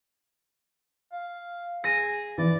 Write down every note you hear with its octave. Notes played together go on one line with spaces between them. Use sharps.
F5
G#4 A#6 D#7
E3 D5